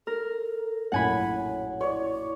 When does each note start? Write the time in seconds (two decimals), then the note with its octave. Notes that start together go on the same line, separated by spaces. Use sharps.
0.07 A4 A#4
0.92 A#1 F#2 A2 C#5 F#5 G#5 B5
1.81 E4 C#5 D5